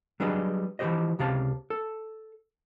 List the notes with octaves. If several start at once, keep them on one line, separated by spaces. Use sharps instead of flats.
F#3 G3 D4 G#4 B4 D#5
E3 F3 G3 G4 C5 D#5
C#2 C3 G4 F5 A5
A4